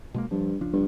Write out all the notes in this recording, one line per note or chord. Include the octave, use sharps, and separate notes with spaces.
B2 G#3 A#3
G2 F3
C#2 F3 D4
G2